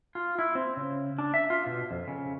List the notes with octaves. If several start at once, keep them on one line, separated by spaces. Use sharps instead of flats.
F4
E4
C4
C#3
D4
E5
F4
B2
F2
C#3